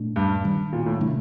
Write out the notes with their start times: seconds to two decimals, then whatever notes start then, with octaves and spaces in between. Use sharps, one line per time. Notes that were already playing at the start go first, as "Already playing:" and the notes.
Already playing: A#2 A3 D4
0.16 G2
0.45 D#3 G3 D4
0.73 A#2
0.86 A2
1.01 C3 D#3 A3 D4